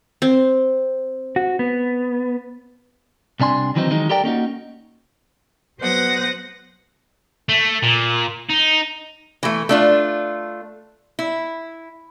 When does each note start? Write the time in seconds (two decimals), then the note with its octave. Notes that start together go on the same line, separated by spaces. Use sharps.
0.22 C4
1.36 F#4
1.59 B3
3.40 C2 C3 D4 G#5 C6
3.76 D#3 E3 F#3 C4 D#4
3.90 D#3 E3 F#3 G#3 D#4
4.09 G4 A4 A#4 D5 G5
4.24 A#3 C#4 D#4 F#4
5.79 F#3 B3 C5 F#5 D#6 A#6
7.49 A3
7.83 A#2
8.49 D#4
9.43 E3 A3
9.69 A3 D4 F4
11.19 E4